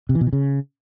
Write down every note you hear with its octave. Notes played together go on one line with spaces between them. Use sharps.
C3
E3
B2
E3
C#3